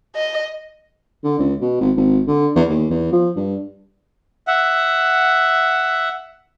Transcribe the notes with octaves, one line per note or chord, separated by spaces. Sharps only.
D#5
D3
C#2
B2
G#1
G#1
D3
E2
D#2
E2
F3
G2
E5 F#5